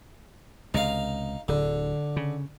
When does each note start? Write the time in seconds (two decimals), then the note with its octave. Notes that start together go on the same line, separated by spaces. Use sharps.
0.74 C#2 C3 D#4 F5
1.48 D1 D3
2.16 C#3